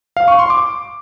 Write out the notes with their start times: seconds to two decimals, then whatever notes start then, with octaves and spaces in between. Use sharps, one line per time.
0.17 F5
0.28 C#6
0.39 C6
0.50 D6